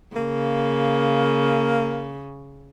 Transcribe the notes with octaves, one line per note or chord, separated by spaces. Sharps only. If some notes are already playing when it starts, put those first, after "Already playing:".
C#3 A#3